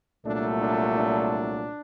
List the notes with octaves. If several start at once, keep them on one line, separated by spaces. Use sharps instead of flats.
C2 A#2 F#3 A3 D4
D4
D4